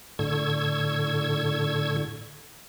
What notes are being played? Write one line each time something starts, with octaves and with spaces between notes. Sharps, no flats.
A2 D3 C#6 E6 G#6